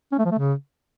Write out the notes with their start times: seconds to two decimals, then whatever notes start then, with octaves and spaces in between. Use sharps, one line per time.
0.12 C#4
0.18 A3
0.25 F3
0.32 A3
0.38 C#3